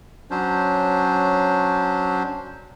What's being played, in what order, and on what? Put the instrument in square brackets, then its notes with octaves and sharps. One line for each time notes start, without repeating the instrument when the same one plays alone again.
[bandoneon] F#3 C#4 D4 C5